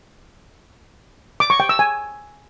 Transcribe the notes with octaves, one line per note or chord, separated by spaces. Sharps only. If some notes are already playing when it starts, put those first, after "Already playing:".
D6
C#6
G5
E6
G#5